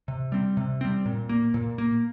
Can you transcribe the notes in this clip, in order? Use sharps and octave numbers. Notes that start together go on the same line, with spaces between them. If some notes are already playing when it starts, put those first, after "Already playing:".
C3
G3 C4
C3
G3 C4
A#2
A#3
A#2
A#3